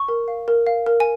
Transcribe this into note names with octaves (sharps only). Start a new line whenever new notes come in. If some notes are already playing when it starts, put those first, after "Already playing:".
Already playing: C#6
A#4
F5
A#4
F5
A#4
G#5